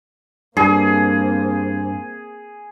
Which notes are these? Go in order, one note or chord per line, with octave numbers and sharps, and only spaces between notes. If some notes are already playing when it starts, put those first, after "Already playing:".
G2 A#3 C4 G#4